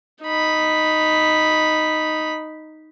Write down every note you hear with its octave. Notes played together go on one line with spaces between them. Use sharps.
D#4 B5